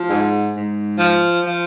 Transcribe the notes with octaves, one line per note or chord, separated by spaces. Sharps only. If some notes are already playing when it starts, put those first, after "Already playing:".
Already playing: F3
G#2
G#2
F3
F3